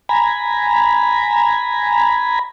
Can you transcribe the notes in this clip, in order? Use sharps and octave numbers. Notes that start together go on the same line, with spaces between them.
G#5 A#5 B5